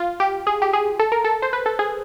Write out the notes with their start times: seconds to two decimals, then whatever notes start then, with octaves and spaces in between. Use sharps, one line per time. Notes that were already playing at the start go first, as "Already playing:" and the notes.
Already playing: F4
0.20 G4
0.47 G#4
0.62 G4
0.73 G#4
0.99 A4
1.12 A#4
1.24 A4
1.42 C5
1.53 B4
1.66 A4
1.79 G#4